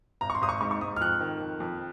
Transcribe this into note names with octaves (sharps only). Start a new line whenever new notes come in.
G#1 A#5
C#6
C6
G#1 D#6
C#6
G#2 C#6
C#6
G#2 D#6
F6
F2 F#6
D#3
F2
F2